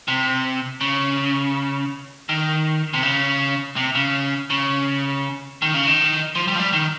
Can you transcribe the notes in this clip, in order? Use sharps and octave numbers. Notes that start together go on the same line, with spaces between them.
C3
C#3
D#3
C3
C#3
C3
C#3
C#3
D#3
C#3
D#3
F3
G3
F3
G3
D#3